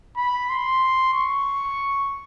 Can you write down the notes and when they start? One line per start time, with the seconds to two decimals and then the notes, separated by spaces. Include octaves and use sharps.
0.17 B5
0.50 C6
1.14 C#6